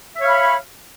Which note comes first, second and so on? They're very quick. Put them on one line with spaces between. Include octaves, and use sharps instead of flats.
E5 C#5 F5 B5